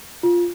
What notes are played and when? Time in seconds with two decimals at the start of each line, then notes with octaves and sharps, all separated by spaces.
0.23 F4